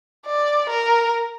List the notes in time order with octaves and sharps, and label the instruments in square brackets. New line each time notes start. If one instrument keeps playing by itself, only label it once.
[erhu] D5
A#4